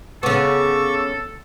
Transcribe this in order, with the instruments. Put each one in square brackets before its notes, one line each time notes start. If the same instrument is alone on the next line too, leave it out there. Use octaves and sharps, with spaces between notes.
[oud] C#3 B3 [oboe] A4 [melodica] C#6 D6